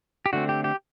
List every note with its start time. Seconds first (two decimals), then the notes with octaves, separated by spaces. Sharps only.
0.26 G4
0.33 D3 A3 C4 F#4
0.49 G4
0.64 G4